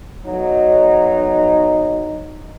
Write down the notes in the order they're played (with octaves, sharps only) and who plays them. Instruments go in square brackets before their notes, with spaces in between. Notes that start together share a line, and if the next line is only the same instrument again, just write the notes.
[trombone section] B1 F#3 D#4